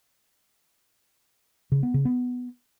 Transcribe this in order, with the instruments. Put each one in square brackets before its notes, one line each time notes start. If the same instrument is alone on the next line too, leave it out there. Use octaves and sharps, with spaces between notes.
[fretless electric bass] C#3
B3
C#3
B3